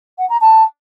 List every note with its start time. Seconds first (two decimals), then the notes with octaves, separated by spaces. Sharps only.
0.18 F#5
0.29 A#5
0.40 A5